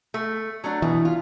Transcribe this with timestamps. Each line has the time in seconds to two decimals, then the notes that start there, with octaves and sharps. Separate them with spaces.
0.14 A3
0.64 F#3 A3 D4
0.82 B2 E3
1.05 F4